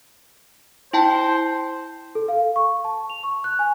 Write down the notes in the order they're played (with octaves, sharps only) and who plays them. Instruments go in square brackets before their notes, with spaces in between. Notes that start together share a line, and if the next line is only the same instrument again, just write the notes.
[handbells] E4 G5 A5 [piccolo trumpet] C5
[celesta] A4
F5
C#6
A5
F7
C#6
F#6
G#5